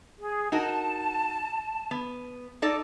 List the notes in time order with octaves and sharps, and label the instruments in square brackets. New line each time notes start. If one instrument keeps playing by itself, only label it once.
[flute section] G#4
[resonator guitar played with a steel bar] D#4 F#4 A#4 [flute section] A5
[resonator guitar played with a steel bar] B3
D#4 A4 D5